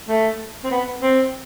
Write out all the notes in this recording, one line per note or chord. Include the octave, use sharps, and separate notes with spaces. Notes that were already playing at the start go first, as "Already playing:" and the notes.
A3
C4
B3
C4